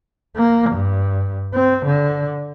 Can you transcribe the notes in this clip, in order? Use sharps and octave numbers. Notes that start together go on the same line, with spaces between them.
A#3
G2
C4
D3